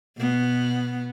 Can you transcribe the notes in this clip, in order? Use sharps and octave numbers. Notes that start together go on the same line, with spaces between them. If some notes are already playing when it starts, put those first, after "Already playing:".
B2 B3